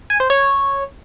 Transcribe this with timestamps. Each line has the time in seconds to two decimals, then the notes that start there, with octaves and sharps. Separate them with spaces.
0.10 G#5
0.20 C5
0.30 C#5